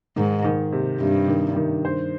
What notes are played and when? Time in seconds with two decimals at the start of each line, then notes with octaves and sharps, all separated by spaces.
0.16 G#2 D#3
0.44 D#3
0.72 C3
1.00 G2 C3
1.28 D#3
1.56 D#3
1.85 C5